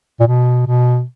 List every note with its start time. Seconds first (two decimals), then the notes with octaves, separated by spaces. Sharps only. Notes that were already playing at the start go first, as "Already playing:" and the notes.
0.20 A#2
0.27 B2
0.67 B2